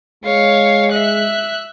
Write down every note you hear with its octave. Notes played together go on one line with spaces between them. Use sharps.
G#3 C#5 F5
E5 F#6